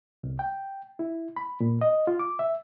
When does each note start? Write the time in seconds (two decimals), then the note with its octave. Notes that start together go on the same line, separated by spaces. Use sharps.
0.23 C2
0.39 G5
0.99 E4
1.36 B5
1.60 A#2
1.81 D#5
2.07 F4
2.19 D6
2.39 E5